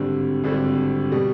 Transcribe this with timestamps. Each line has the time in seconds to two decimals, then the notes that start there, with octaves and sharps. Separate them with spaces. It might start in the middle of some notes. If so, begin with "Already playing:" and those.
Already playing: G#1 G2 D3 G3 C4
0.44 G#1 G2 D3 G3 C4
1.12 B2 G3